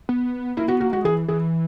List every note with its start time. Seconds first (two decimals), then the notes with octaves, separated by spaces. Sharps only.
0.09 B3
0.57 A#3 E4
0.68 B3 F#4
0.80 A#3 F#4
0.92 G#3 F#4
1.04 E3 G#4
1.28 E3 G#4